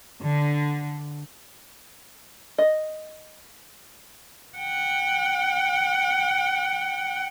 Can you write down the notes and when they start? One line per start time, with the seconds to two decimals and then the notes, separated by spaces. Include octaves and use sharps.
0.21 D3
2.58 D#5
4.58 F#5 G5